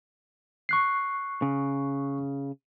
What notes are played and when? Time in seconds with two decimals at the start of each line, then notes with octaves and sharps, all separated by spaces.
0.69 C#6 F#6 C7
1.42 C#3